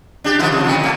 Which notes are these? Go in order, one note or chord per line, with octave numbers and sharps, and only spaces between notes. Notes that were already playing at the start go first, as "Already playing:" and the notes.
D4 G4
D#3 F3 E4
C3 F3
F2 A#2 D#3
A#2 A3